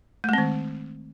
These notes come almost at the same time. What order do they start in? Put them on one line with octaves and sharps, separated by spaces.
A3 G#3 C4 D#3